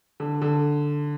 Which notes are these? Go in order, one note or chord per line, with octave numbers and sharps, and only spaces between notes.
D3
D3